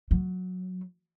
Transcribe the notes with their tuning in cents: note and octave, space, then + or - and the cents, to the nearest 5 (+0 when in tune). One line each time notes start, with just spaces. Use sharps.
F#3 -10